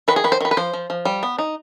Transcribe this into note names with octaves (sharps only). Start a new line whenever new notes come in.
D#3 B4
G#4
D#3 B4
C5
D#3 B4
B4
F3 C5
F3
F3
G3
B3
D#4